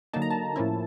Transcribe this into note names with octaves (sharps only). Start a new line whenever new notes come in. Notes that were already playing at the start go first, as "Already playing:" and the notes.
D3 F#3 A#3 D#4 A5
A#5
A5
A2 F3 A#3 C#4 E4